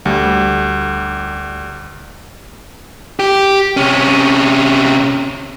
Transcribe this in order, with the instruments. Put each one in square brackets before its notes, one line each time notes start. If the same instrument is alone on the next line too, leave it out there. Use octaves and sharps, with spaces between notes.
[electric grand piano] D2 G3
[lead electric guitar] G4
C3 C#4